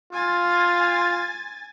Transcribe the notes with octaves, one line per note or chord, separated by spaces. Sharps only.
F4 G#5 A6